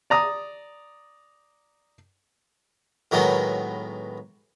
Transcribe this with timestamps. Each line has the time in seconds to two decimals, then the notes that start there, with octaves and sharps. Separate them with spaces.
0.10 D5 A#5 D#6
3.11 A2 D#3 F#3 G#3 B3